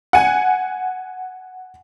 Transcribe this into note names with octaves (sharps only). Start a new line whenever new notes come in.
F#5 G#5